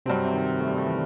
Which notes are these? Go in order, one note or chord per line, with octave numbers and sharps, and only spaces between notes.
G2 C3 F#3 C4
C3
D#3
A3
G3
A3
E3